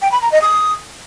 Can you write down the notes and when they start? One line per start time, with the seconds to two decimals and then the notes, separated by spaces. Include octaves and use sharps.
0.02 G5
0.12 B5
0.22 A#5
0.32 D#5
0.42 D#6